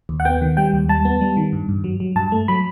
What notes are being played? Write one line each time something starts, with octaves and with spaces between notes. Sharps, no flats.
D#2
F#5
B3 G5
D#3
G3 G5
D#2
G3 A5
B3
G3
D#3
G2
G2
F#3
F#3
G2 A5
A3
F#3 B5